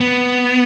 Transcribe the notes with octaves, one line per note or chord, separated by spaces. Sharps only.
B3